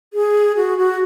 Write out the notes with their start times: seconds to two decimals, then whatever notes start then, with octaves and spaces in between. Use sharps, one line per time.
0.13 G#4
0.56 F#4
0.78 F#4